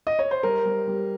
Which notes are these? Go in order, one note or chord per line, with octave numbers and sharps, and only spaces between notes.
D#5
C#5
C5
G3 A#4
G3
G3